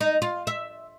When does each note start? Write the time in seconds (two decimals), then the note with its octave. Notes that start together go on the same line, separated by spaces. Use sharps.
0.01 D#4
0.22 F4
0.47 E5